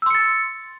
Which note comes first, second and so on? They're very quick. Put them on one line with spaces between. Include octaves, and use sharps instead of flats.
E6 C6 C#7 A6